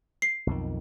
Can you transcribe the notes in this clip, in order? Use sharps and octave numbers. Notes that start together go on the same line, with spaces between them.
C7
B1 F2 D#3